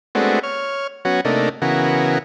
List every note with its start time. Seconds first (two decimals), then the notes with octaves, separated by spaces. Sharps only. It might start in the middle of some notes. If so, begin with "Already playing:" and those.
0.15 G#3 A3 B3 C4 D4 F#4
0.43 C#5 F6
1.05 F#3 B3 C#4 F#4
1.25 C3 A3 A#3 D4 D#4
1.62 C#3 E3 B3 F#4 A#4